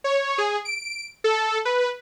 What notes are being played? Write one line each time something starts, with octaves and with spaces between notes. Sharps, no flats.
C#5
G#4
D7
A4
B4